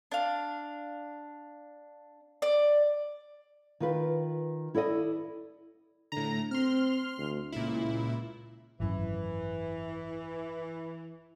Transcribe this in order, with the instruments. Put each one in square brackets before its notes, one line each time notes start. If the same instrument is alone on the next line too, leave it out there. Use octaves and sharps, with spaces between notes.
[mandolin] D4 F5
D5
[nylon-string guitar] D#3 F4 B4
E4 A4 D5 D#5
[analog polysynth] A2 A#5 [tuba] D3
[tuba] C4 [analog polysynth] C6 F6
[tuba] D2
[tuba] C#2 [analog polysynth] A#2 E4
[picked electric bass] G#1 F#2 [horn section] E3